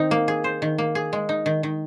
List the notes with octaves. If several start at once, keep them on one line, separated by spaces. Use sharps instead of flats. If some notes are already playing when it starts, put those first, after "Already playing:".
Already playing: D#3 C4 D#4
A#3
G#4
C5
D#3
A#3
G#4
G#3
D#4
D#3
D#3